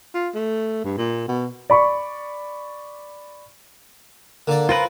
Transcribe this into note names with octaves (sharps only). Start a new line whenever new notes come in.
F4
A3
G2
A#2
B2
D5 B5 C#6
D3 A#3 D5
C4 F4 A#4 B4